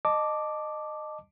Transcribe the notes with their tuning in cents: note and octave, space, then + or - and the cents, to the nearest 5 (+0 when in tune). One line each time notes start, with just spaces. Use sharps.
D#5 -20 A5 +0 D6 +0